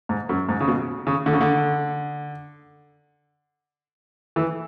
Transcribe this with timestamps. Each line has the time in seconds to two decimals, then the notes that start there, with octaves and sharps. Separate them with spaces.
0.09 G#2
0.29 F#2
0.49 G#2
0.61 C#3
0.68 B2
1.07 C#3
1.26 D3
1.33 C#3
1.41 D3
4.36 E3